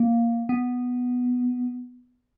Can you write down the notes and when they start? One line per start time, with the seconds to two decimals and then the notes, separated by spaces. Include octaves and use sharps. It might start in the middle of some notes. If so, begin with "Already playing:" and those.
Already playing: A#3
0.49 B3